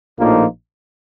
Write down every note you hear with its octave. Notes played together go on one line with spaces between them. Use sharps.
A#1 A2 F3 A#3 D#4